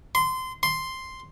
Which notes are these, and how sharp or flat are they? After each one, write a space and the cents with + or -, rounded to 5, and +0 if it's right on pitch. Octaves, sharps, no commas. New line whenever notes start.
C6 -20
C6 +0